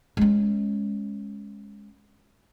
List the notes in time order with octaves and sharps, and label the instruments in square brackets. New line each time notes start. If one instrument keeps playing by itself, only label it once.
[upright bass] G#3 C#4